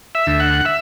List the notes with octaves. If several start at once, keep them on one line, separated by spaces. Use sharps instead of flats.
E5
D2
F#5
E5